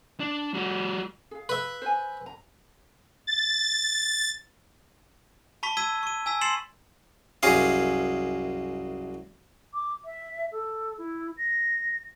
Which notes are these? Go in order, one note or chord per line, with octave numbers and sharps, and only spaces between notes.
D4
G3 F#4
G#4 F5
B4 E5
C5 G#5
A#5
A6
A5 B5 C#6 B6
E6 G#6 B6 D#7 G7
C#6 D#7
G#5 E6 B6
C6 A6 C7 C#7 E7 F#7
C2 F#2 G#4 F5
D6
E5
A4
E4
A#6